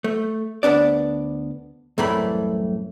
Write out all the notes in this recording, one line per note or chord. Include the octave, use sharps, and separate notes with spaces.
A3
D2 B3 D4 D5
C2 F#2 A2 E3 A3 B5